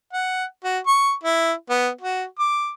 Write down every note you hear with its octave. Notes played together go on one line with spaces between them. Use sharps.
F#5
F#4
C#6
E4
B3
F#4
D6